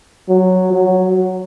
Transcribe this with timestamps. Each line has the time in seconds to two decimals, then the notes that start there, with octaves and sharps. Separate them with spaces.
0.29 F#3
0.73 F#3